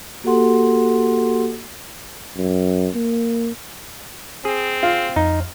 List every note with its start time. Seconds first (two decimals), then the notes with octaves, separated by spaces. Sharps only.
0.24 A#3 F#4 G4 A4 F#5 C6
2.38 F#2
2.95 A#3
4.45 C4 G#4
4.83 F4
5.16 F2 D#4